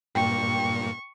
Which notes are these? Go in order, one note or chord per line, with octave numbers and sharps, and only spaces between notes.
G2 A#2 A#3 G5 C#6